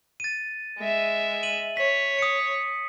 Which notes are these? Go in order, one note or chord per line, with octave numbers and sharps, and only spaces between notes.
A6 D#7
G#3 E5
D#7 F#7
C#5 B6
D#6 C#7